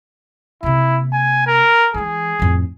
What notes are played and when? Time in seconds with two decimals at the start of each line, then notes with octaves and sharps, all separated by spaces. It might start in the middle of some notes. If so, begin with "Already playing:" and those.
0.63 C3 A#3 E4
1.12 G#5
1.47 A#4
1.94 E3 G#3 G#4
2.39 F2 A2